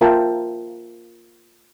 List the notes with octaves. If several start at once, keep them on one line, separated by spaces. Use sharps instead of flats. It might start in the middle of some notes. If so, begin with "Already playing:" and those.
A#3 F4 A#4 E5 G5 A5